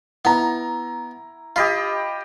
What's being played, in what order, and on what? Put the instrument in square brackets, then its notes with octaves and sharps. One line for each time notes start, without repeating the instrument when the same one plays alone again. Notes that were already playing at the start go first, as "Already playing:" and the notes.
[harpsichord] B3 [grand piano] E4 A#5
[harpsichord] F4 [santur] G4 D#5 B5